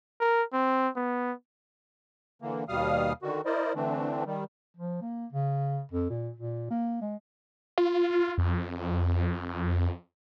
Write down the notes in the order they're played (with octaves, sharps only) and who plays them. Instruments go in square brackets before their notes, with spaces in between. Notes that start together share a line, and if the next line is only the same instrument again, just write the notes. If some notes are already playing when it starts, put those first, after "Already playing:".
[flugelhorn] A#4
C4
B3
[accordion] D3 E3 A#3
D#2 B2 G3 F5 D#6 F6
D3 D#3 F#4
E4 A#4 C5 D5 D#5
D3 E3 A3 C4 D4
D#3 G3
[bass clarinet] F3
A#3
C#3
F2
A#2
A#2
A#3
G#3
[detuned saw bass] F4
F2